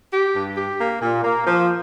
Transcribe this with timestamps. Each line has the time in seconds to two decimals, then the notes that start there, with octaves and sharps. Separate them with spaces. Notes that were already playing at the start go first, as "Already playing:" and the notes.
0.13 G4
0.36 G2
0.57 G4
0.80 A#3
1.02 A#2
1.24 A#3
1.47 F3